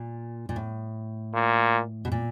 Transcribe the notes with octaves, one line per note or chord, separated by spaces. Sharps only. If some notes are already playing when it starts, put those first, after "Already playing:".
Already playing: A#2
A#2
A2
A#2
B2
A#2